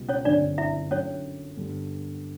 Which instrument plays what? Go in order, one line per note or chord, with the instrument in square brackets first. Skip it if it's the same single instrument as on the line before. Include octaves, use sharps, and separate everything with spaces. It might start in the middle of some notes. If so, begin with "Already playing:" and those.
Already playing: [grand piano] C#2 B2 G3
[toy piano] C#4 C#5
[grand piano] G1 F#2 D3 G3 C4 [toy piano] D4 D5
[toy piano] E4 E5
[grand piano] F#2 D3 F#3 [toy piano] C#4 C#5
[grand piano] G2 D3 G3 B3